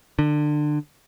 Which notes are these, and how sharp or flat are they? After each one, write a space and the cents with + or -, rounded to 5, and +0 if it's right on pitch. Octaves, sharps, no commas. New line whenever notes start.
D3 +25